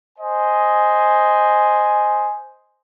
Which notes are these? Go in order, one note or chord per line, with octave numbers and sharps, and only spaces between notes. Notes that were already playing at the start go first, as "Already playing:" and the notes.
C5 D#5 G#5